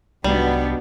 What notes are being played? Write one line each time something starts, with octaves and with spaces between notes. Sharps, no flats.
C2 G#2 F#3 G3 B3 D4